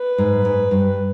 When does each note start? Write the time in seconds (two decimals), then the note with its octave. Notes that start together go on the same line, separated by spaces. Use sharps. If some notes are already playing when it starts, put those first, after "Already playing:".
Already playing: B4
0.18 G#2
0.45 G#2
0.71 G2